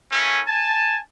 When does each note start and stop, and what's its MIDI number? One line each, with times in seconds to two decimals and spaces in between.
0.12 0.41 57
0.12 0.41 58
0.12 0.41 61
0.12 0.41 64
0.12 0.41 80
0.47 1.00 80
0.47 1.00 81